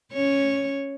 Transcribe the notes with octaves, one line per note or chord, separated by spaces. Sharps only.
C#4 C#5